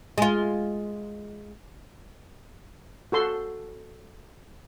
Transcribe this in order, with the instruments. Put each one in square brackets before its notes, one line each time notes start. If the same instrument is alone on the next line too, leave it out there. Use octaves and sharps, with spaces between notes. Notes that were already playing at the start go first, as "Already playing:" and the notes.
[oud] G#3 F4
[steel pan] F#4 A4 C6